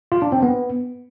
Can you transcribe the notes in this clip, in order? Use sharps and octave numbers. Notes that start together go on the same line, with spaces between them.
F4
D4
C4
B3